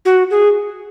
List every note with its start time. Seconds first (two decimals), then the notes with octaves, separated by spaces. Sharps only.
0.05 F#4
0.31 G#4